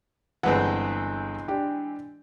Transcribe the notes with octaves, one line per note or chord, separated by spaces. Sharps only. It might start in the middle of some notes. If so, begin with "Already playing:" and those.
G1 E3 G#3 C4 B4 F#5
D4 G4